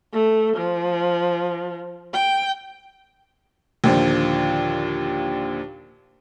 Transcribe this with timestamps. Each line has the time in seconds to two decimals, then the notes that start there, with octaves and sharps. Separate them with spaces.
0.13 A3
0.57 F3
2.14 G5
3.84 D#2 A#2 D3 F3